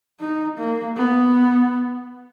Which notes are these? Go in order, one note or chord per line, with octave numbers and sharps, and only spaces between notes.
D#4
A#3
B3